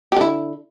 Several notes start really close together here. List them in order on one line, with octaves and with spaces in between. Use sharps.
G4 D3 E4